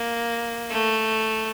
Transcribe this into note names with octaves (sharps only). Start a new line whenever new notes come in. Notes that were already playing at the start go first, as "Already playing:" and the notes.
Already playing: A#3
A3